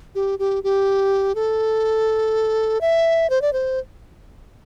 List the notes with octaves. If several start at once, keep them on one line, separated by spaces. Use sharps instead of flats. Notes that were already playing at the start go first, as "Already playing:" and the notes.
G4
G4
G4
A4
E5
C5
D5
C5